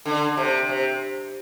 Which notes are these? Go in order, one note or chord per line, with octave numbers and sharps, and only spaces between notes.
D3
C3
C3